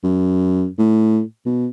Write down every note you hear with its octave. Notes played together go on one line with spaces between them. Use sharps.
F#2
A2
B2